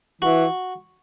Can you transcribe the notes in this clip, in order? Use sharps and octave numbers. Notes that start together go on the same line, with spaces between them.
E3 F#4